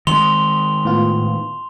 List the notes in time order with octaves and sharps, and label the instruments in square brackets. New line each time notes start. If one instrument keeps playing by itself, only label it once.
[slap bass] D#3 G#3 [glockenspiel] C6 F7 G7
[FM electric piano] A2 B3 F4